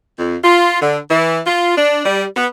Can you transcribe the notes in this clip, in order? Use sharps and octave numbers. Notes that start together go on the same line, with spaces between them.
F2
F4
D3
E3
F4
D4
G3
B3